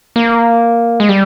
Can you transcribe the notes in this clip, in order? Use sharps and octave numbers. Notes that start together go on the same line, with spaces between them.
A#3
G#3
G3